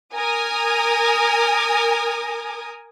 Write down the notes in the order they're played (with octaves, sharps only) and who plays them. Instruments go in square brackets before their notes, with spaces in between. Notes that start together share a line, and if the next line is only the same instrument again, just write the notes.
[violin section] A#4 G#5 D#6